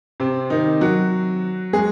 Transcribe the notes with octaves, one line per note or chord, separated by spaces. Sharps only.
C3 C4
D#3 D#4
F#3 F#4
G#3 G#4